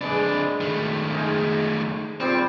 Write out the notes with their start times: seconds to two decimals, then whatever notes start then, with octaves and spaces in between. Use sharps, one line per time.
0.01 F2 G#3 D4 B4
0.61 D#3 A3
1.15 D#4 G#4
2.20 A#2 G3 C4 C5